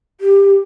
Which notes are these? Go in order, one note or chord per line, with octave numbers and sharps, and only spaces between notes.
G4